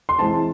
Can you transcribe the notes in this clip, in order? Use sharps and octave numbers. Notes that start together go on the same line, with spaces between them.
C6
E3 G#3 C4 A5